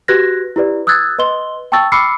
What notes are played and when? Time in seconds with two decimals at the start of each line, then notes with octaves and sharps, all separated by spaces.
0.08 F#4 G4 B4 F#6 G#6 A#6
0.56 E4 G4 B4 D5
0.87 D#6 E6 F#6 G#6 A6
1.19 B4 D#5 C6 G7
1.72 G5 A5 C#6 E6 A6
1.92 B5 D6 E6 F6 C7 C#7